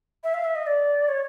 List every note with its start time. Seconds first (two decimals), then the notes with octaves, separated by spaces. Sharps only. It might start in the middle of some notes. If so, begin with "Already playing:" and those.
0.24 E5
0.34 F5
0.44 E5
0.55 D#5
0.67 D5
1.08 C#5